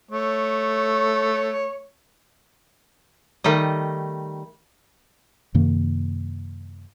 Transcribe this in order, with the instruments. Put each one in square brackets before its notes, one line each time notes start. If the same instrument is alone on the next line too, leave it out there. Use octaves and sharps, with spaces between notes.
[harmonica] A3 C#5
[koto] D#3 G3 A3 D#5
[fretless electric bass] F#2 C3 D#3 A#3